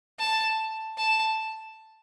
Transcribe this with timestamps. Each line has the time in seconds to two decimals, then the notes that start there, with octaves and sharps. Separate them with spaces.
0.19 A5
0.98 A5